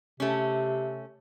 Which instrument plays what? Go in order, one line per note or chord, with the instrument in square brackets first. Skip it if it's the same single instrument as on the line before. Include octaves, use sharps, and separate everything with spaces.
[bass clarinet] C3 [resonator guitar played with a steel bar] A3 C#4